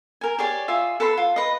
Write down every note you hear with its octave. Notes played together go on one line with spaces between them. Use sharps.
A#4 G#5
G4 G#4 C#5 D5
F4 G#4 E5
A4 B4 B5 C6
F4
B4 D#5